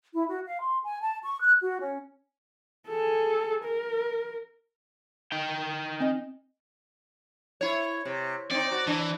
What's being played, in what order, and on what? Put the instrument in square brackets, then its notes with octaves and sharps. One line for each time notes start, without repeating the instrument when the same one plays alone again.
[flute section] E4
F#4
F5
C6
G#5
A5
C#6
F#6
F#4
C#4
[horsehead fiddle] G#4 A4
A#4
[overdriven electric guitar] D#4 G5
[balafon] C4 D#5
[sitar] E4 C#5
C3
[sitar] C4 D#4 [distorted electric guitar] D5
[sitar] F#4
[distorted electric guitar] E3 [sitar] D4